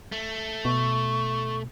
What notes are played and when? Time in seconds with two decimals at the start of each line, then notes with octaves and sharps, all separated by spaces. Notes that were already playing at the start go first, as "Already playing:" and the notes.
0.12 A3
0.65 B2 C#6